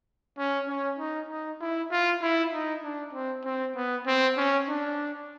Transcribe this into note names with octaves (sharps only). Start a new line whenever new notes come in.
C#4
C#4
D#4
D#4
E4
F4
E4
D#4
D4
C4
C4
B3
C4
C#4
D4